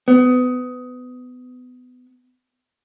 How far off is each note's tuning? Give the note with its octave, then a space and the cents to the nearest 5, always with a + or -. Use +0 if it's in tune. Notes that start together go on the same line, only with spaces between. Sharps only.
B3 +25